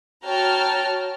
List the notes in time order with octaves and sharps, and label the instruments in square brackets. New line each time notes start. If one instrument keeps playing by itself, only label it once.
[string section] F#4 C#5 G5 A5 A#5 F6